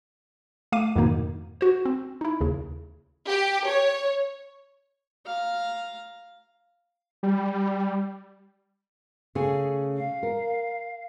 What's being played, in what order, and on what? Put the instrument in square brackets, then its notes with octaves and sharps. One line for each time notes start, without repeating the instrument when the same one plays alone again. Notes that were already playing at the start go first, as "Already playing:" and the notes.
[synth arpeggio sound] A3 F5 D6 D#7
F2 G#2 B2 D#3 A#3 D#4
F#4 C5
C4
D#4 E4
D#2 C#3
[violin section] G4
C#5
[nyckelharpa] F5 A#5
[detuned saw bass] G3
[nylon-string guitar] C#3 A3 G#4
[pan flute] F5
[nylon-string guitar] A#4